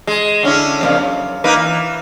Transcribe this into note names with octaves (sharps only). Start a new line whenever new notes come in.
G#3
D3 C#4 E4
F2 A#2 C#3
F#2
A#3 D#4 B4
E3